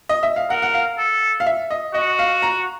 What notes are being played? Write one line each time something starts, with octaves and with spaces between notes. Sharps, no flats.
D#5
E5
F5
A#4 F#5
F#5
F5
A4
F5
E5
D#5
F#4 D#5
F5
A#5